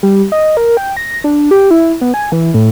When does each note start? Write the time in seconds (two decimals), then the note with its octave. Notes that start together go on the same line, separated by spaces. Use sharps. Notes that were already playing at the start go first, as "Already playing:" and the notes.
0.03 G3
0.32 D#5
0.57 A#4
0.77 G5
0.97 A#6
1.24 D4
1.51 G4
1.71 E4
2.01 B3
2.14 G#5
2.32 E3
2.54 A2